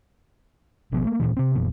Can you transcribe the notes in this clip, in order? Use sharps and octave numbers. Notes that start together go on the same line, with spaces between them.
G#1 B2 F3 B3
A3 A#3
D#1 F2 A#2 E3
C3 C4
F1 F2 A#2